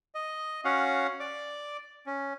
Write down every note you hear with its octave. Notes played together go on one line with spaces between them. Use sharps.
D#5
C#4 F#4 F5 F#5
D5 D6
C#4